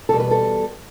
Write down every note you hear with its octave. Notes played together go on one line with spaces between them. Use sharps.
E2 B2 G3 A4
B4
A4